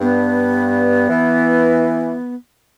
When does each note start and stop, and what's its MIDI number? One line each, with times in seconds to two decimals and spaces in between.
0.01 1.09 43
0.01 2.35 59
1.09 2.12 52